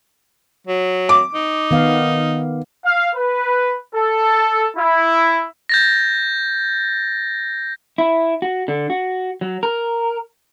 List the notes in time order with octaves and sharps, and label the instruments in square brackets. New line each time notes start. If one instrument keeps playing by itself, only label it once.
[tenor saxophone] F#3
[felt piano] D6
[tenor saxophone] D#4
[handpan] D#3 B3 F5
[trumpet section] F5
B4
A4
E4
[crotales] G6 A6 A#6
[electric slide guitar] E4
F#4
D3
F#4
F#3
A#4